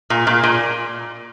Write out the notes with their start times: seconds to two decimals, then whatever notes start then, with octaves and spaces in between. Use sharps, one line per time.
0.10 A#2
0.27 A#2
0.43 A#2